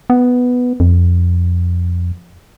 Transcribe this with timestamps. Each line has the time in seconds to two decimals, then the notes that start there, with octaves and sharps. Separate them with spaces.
0.10 B3
0.80 F2